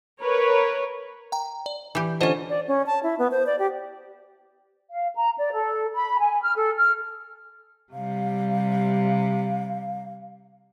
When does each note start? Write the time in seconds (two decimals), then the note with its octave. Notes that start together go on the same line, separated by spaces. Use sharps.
0.19 A#4 B4 C#5
1.32 G5 A#5
1.66 D5
1.95 E3 G4
2.21 D3 C#4 F4 C5 D#5
2.49 D5
2.68 C#4
2.86 A5
3.03 E4
3.19 B3
3.31 C5
3.46 D5
3.59 G4
4.91 F5
5.16 A#5
5.39 D5
5.52 A4
5.94 B5
6.20 G#5
6.42 F6
6.56 A4
6.77 F6
7.93 C3 G3 F5